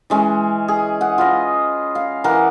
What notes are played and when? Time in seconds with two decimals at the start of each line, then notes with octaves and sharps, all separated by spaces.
0.10 E3 G#3 C#4
0.68 G#4
1.01 F#5
1.18 F4 B4 D#5
1.95 F5
2.24 E3 A#4 F#5 D6